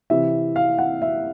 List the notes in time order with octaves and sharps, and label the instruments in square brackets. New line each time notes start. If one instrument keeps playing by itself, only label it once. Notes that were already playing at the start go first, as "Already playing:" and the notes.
[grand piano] C3 E3 E5
F5
F#5
E5